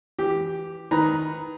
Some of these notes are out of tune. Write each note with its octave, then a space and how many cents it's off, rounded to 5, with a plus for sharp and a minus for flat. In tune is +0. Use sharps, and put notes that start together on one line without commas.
E3 +0 G4 +0
D#3 +10 B4 +0 A#5 +0